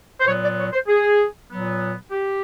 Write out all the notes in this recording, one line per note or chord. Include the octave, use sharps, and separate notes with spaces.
C5
A#2 F#3 B3 C#5
D5
C#5
C5
G#4
A#2 F#3 B3
G4